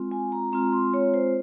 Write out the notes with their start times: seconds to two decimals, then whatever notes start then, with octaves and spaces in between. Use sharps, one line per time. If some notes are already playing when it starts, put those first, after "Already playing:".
Already playing: G#3 C4 F4
0.11 G#5
0.32 A#5
0.52 G#3 C4 F4 A#5
0.73 C6
0.94 C#5
1.14 C5